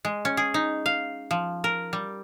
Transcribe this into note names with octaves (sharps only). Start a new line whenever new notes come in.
G#3
C#4
G#4
D#4
F5
F3
A#4
G3